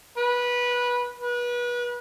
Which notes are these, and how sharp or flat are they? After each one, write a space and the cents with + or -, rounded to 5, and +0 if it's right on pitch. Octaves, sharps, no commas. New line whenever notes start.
B4 -15
B4 -30